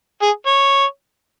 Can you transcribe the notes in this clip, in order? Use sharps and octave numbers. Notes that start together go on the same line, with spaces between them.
G#4
C#5